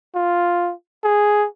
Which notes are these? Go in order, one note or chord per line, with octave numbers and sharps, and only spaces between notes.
F4
G#4